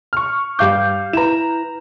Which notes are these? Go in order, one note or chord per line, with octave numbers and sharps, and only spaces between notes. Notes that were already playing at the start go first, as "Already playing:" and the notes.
C#6 F6
G2 G3 F5 D6 G6
E4 B4 A#5 E7